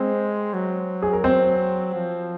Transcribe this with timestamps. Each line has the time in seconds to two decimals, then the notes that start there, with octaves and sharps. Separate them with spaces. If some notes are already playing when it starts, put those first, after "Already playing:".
Already playing: G#3 C4 C5
0.53 F#3
1.02 G#4
1.13 A#4
1.24 C4 C5
1.95 F3